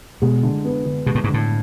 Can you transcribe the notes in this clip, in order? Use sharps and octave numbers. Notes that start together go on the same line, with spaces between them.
B2 G#3
D3
B3
D3
B2 G#3
A2
G#2
D3
A2